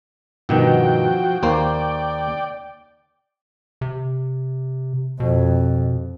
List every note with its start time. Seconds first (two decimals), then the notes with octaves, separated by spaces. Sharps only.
0.49 G2 B2 D#3 F3 F#4 G5
1.43 D#2 A#3 C5 D5 G5
3.81 C3
5.20 F2 B2